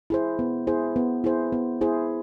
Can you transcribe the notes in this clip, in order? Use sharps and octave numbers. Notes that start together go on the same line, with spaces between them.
E4 G#4 C5
B3
E4 G#4 C5
B3
E4 G#4 C5
B3
E4 G#4 C5